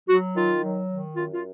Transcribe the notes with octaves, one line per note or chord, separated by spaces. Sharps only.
F#3 F#4
D#3 F4
F#3
D#3
F#2 F4
F4